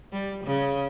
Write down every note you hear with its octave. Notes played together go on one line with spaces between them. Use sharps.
G3
C#3